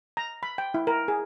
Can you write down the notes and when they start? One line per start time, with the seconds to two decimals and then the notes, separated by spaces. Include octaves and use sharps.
0.17 A#5
0.43 B5
0.58 G5
0.74 E4
0.87 A#4
1.08 G#4